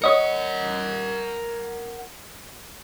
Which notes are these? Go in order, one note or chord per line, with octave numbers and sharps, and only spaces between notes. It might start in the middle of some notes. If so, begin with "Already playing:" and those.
A#4 C#5 D#5 F#5 C#7